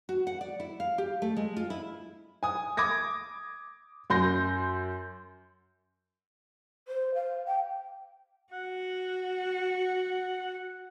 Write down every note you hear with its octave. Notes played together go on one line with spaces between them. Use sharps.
F#4
F#5
D5
E4
F5
G4
A3
G#3
F4
E4
G#5 D#6
D6 D#6 G#6 A#6
F#2 C6 G6 A#6
C5
F5
G5
F#4 F#5